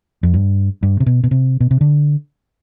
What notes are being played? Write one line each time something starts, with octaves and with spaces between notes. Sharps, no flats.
F2
G2
G2
C3
B2
B2
C3
B2
C3
D3